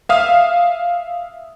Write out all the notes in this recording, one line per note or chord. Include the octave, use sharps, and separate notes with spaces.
E5 F5 D#6 F6